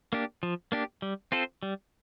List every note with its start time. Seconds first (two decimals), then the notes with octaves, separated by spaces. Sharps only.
0.13 A#3 D4 G4
0.43 F3
0.72 A#3 D4 G4
1.02 G3
1.32 C4 F4 A4 C5
1.63 G3